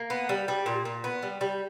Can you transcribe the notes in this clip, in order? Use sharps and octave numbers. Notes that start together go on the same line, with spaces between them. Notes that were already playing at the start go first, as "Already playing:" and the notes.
Already playing: A#3
B3
G3
G3
A#2
A#2
B3
G3
G3